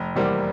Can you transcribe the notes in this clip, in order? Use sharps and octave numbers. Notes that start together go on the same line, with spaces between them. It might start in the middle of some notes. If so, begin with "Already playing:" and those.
Already playing: F1
E2 C3 G3 A#3 C4